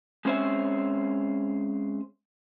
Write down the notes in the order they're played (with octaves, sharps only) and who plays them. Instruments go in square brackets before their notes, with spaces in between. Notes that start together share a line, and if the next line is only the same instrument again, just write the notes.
[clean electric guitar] G#3 C4 C#4 C5 C#5 E5